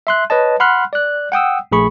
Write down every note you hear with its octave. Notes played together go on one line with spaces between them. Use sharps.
E5 C6 F#6
B4 C#5 D#5 A5
F#5 B5 C6 F6 F#6
D5 F#6
F#5 G5 D#6 E6
A#1 A3 G#4 B5 C#6